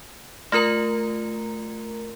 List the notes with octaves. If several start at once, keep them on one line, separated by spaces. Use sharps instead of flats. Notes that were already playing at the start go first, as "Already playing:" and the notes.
A3 F4 A#4 A#5